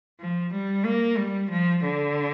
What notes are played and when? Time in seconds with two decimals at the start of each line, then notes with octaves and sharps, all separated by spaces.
0.20 F3
0.52 G3
0.85 A#3
1.17 G3
1.50 F3
1.84 D3